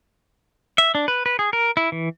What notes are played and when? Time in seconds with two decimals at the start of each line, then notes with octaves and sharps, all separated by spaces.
0.78 E5
0.95 D4
1.08 B4
1.26 B4
1.39 G#4
1.53 A#4
1.77 E4
1.92 E3